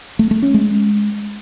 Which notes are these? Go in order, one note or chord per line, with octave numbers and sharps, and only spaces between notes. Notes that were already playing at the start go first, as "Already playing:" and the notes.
A3
A3
C#4
G#3